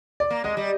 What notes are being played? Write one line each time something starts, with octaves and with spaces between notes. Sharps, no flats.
D5
A#3
G#3 D#5
G3